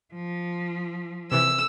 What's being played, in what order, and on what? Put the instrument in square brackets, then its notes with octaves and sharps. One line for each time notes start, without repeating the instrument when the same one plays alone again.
[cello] F3
[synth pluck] C3 E3 [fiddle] E6